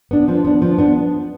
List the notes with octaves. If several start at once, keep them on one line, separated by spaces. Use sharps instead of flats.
B3 D4
F3
B3 D4
F3
B3 D4